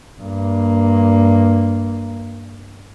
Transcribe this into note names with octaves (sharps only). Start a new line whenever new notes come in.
G2 A#3